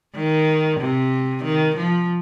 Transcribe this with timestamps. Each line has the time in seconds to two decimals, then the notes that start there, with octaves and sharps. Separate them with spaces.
0.15 D#3
0.80 C3
1.44 D#3
1.77 F3